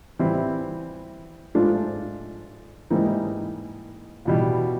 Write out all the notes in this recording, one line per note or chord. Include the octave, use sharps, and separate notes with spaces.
E3 G3 C4 E4
G#2 F3 A3 D4 F4
G#2 E3 G3 A#3 D#4
E2 B2 G3